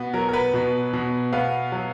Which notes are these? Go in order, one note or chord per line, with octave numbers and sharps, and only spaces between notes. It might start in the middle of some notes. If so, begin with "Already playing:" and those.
Already playing: B2 B3
F#3 A#4
A#4
B4
B2
B2
B3 F5
F#3